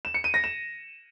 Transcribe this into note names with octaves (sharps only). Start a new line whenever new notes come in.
E7
C#7
D#7
A#6
E7